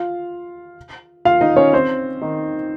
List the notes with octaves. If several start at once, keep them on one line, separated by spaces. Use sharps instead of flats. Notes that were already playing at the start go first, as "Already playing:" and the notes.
Already playing: F4 F5
F4 F5
D#4 D#5
C#4 C#5
C4 C5
D#3 D#4